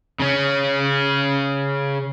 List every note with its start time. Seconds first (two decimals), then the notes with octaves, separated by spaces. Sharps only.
0.20 C#3 C#4